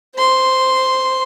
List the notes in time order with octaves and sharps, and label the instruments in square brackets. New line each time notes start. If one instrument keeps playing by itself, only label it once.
[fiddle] C5 C6